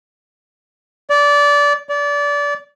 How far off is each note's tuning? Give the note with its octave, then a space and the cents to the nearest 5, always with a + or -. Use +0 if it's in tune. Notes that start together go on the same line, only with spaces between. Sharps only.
D5 -20
D5 -25